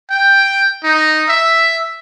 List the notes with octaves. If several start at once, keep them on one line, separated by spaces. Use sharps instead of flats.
G5
D#4
E5